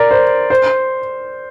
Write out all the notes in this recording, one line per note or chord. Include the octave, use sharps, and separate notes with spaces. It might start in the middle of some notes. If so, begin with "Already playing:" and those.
Already playing: A#4 D5
C5
C5